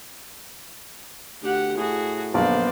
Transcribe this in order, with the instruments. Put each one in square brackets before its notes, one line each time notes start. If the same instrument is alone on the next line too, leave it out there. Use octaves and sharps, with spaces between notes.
[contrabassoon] D2 [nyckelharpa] G4 F#5
[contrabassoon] A2 [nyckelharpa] F#4 G#4
[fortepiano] A#1 [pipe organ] F#2 B3 C5 [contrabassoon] D3 [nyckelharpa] D5